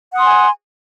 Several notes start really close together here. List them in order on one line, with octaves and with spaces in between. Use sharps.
F#5 D#6 C6 G#5